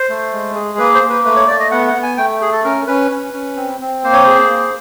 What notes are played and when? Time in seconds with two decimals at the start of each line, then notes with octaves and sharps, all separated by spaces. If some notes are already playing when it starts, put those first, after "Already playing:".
Already playing: C5
0.10 A3
0.32 G#3
0.55 G#4
0.78 A#3 B4
0.95 C5
1.02 A#3
1.09 B4
1.25 A3 B4
1.36 C#5
1.48 A3 D5
1.60 D#5
1.71 B3 F#5
1.87 F#5
1.95 B3
2.03 G#5
2.18 A3 G5
2.41 G#4
2.52 A4
2.64 C#4 A#4
2.87 C#4 B4
3.11 C#4
3.33 C#4
3.57 C4
3.81 C4
4.04 A#3 C5
4.13 C#5
4.24 G#4 C5
4.50 A#3